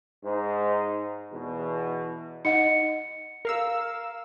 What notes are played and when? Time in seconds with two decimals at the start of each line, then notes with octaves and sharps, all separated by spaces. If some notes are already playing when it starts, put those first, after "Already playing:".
0.24 G#2 D#4 C5
1.32 E2 B2
2.45 D#4 D#5 F#5 C#7
3.45 A#4 F5 E6